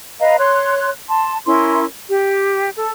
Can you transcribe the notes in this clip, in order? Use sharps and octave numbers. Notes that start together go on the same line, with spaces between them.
B4 D#5 F5 A#5
C#5 C6 F#6
A5 C6
C#4 E4 A#4 C6
G4
A4